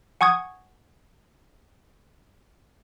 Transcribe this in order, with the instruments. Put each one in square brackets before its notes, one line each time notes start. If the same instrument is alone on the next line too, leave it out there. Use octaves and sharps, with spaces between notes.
[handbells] F#5 G#5 C#6 D#6 G#6